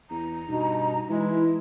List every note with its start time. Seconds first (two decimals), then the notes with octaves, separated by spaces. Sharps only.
0.10 E2 A#5
0.48 G2 B2 D#4
1.09 E3 G#3 E4